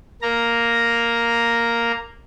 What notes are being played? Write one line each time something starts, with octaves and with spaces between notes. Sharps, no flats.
A#3 A#5